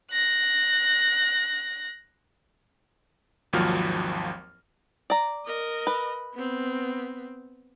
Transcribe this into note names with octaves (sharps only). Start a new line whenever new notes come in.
F#6 A#6
G#1 D#2 F3 F#3 F6
D5 A#5
A#4 D#5
B4
B3 C4